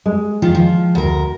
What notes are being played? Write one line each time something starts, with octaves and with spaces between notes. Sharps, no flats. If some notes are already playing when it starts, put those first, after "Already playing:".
G#3
D#3 F3 F4
F3
D2 A#4